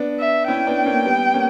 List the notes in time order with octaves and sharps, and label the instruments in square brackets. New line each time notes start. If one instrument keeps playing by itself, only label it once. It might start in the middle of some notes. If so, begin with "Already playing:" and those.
Already playing: [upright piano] B3 D4
[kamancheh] E5
[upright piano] C#4 E4 [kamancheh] G5
[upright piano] B3 D4
A#3 C#4
G3 B3
A#3 C#4